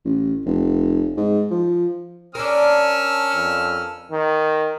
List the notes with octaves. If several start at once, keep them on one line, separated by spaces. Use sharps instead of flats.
A1
F1
G#2
F3
C#4 D4 A#4 E6 F6
F2
D#3